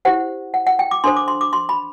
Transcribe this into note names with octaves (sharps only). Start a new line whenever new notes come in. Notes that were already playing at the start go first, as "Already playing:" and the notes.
E4 G4 C5 F#5
F#5
F#5
G5
D6
D4 A4 C5 C6
D6
C6
D6
C6
B5